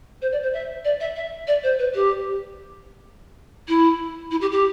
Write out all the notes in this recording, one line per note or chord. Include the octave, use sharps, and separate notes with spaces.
C5
D5
C5
E5
D5
E5
E5
D5
C5
B4
G4
E4
E4
G4
G4